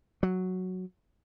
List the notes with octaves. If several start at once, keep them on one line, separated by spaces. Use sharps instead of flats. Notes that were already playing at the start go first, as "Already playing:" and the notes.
F#3